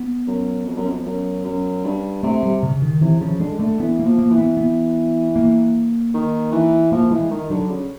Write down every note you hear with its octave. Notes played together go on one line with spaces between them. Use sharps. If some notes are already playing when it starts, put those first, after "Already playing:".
Already playing: B3
F#2
F2
F#2
F2
F#2
F#2
G2
C3 A3
G3
C#3
D#3
C3 E3
C#3 F3
D3 G#3
D3 A3
E3 B3
A#3
F3
A#3
E3
B3
B3
A#3
D#3
E3
F3 A#3
E3 G#3
D#3
D3 F#3
C#3